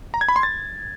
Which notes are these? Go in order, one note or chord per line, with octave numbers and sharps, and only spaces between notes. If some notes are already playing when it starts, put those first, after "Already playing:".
A#5
G#6
B5
C6
A6